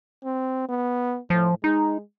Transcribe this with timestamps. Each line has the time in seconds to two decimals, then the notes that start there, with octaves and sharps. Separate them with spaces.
0.24 C4
0.69 B3
1.30 A2 F3
1.64 G#3 D#4